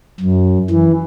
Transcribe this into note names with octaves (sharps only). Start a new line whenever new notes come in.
F#2
E3